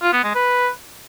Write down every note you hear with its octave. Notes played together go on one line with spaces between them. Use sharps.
F4
B3
G#3
B4